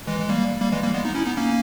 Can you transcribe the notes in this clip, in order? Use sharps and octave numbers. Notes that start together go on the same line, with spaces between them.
E3 G#3
G#3
G3 A#3
G3 A#3
E3 G#3
G3 A#3
G#3 B3
B3 D#4
C#4 E4
B3 D#4
A#3 C#4